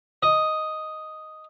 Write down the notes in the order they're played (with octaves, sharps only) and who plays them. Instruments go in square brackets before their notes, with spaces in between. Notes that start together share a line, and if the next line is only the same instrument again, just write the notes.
[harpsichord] D#5